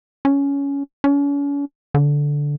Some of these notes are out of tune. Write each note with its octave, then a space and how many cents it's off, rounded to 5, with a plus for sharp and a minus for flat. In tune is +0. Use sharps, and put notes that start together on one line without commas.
C#4 +15
C#4 +40
D3 -10